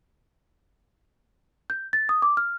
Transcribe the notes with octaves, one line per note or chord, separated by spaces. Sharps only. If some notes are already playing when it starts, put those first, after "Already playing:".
G6
A6
D#6
D6
F6